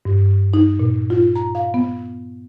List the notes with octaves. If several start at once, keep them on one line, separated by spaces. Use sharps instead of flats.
G2
D#4
A#2
F4
A#5
F5
B3